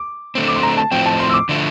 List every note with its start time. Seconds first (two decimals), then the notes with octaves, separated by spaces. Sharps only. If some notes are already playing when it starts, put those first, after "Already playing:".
Already playing: D6
0.35 D3 A3 C4
0.48 D6
0.56 C6
0.63 A#5
0.77 A5
0.91 A2 F3 C4 G5
1.06 A5
1.20 C6
1.30 E6
1.34 D6
1.49 D3 F3 A3